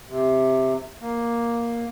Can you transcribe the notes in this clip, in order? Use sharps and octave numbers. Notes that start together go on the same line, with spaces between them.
C3
A#3